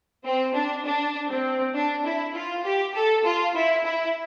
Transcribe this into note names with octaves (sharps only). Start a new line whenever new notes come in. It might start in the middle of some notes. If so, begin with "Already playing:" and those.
C4
D4
D4
C4
D4
E4
F4
G4
A4
F4
E4
E4